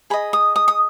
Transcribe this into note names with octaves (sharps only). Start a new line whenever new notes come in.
G#4 D#5 B5
D#6
D#6
D#6